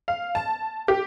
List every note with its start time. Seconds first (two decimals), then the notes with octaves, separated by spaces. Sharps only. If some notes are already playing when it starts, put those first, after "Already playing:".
0.08 F5
0.35 A5
0.88 G4